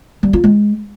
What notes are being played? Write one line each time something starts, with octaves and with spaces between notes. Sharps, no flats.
G3
F4
G#3